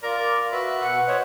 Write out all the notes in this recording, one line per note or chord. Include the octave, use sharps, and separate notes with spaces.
F4 A#4 D5
F#4 B4 E5
B2 F#5
C5 C#5 D#5 F#5